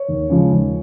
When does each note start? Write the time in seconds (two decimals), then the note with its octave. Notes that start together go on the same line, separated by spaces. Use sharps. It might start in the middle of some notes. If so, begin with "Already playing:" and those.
Already playing: C#5
0.09 D#2
0.30 C#3 F3 G#3
0.50 D#2